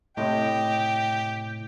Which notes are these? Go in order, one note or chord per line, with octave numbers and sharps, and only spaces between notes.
A2 C3 G4 D#5 G5